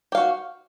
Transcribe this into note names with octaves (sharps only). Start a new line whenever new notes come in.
F#4 G4 F5